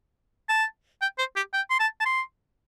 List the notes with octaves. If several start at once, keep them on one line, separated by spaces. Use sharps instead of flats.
A5
G5
C5
G4
G5
C6
A5
A5
C6